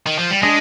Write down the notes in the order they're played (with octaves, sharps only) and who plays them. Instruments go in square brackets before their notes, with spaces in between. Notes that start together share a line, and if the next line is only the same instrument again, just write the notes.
[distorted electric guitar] D#3
F3
G3
[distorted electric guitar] G#3 [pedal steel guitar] D4 G#4 D#5